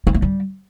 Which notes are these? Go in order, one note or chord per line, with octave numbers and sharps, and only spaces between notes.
C4
A3
G3